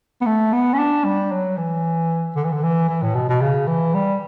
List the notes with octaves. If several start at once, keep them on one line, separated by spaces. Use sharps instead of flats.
B3
A3
B3
C#4
D4
G3
F#3
E3
D3
E3
D3
E3
E3
A2
B2
B2
C#3
E3
G3